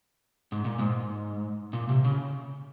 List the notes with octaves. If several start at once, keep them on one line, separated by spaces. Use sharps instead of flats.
G#2
A#2
G#2
A#2
C3
C#3